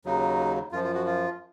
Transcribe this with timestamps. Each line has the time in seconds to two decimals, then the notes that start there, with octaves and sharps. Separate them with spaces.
0.05 D#2 C#3 F#3 D#4
0.72 F#2 F4
0.75 F3
0.84 F4
0.95 F#4
1.06 F4